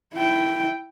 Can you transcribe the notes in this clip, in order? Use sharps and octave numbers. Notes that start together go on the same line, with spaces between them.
E4 G5